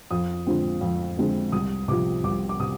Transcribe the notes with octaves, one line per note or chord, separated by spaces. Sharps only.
F2 D#6
D3 F3 G#3 C4
F2
D3 F3 G#3 C4
C2 D#6
C3 F3 D6
C2 D6
D6
C3 D#6